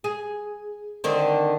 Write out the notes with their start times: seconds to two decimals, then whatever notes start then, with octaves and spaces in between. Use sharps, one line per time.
0.04 G#4
1.04 D3 D#3 C4